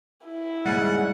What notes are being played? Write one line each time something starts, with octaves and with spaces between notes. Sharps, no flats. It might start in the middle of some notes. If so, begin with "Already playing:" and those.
E4
D#2 G#2 C#3 G3 F#5